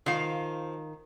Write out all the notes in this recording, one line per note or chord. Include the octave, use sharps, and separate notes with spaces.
D#3 F3 F5